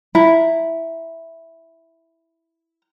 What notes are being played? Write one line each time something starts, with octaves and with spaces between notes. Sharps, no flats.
E4 A#5